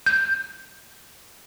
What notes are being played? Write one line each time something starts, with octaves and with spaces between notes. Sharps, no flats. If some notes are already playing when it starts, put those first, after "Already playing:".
G6